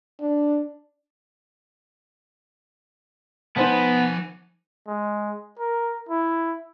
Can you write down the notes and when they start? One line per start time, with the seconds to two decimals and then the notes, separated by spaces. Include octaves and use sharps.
0.20 D4
3.57 F3 B3 D#4 C5 G#5 A5
4.87 G#3
5.59 A#4
6.09 E4